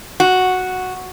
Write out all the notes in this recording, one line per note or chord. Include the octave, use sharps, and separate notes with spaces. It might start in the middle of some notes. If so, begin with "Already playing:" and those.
F#4